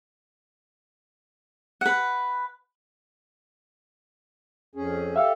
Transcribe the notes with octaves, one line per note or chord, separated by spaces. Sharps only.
B4 F#5
F2 C#4 G#4
G4 A4 E5 F5